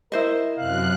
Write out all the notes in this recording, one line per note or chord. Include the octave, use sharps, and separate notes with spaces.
E4 A#4 C5 D#5
F#2 C3 F5 F#6